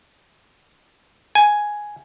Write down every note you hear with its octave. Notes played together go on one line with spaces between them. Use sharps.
G#5